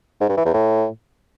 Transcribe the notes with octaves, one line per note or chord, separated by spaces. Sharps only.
G#2
G2
E3
E2
A2